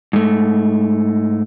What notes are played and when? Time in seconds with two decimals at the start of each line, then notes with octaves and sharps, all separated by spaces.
0.13 G#2 A3